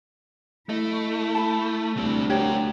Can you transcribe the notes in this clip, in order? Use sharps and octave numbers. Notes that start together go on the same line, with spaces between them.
A3 E4 D#5
A5 B5
D2 G3 C4
F#4 G4 A#4 C#5